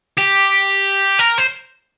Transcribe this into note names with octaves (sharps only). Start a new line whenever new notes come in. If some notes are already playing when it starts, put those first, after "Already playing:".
G4
A#4
C5